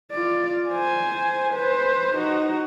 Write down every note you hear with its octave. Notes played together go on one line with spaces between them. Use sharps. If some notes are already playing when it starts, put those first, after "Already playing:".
F4 D5
C5 G#5
B4 C5
D#4 F#4